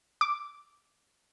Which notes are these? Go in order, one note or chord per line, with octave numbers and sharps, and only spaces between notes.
D6